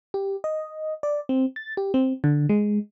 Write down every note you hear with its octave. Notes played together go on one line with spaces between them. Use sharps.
G4
D#5
D5
C4
A6
G4
C4
D3
G#3